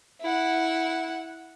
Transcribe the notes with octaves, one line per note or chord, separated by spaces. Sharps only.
E4 F#5